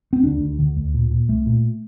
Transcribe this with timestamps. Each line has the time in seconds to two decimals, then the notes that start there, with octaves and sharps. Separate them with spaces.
0.13 C4
0.23 D2 D4
0.41 D2
0.59 D3
0.77 D2
0.94 A#2
1.11 A#2
1.28 C2 A3
1.46 A#2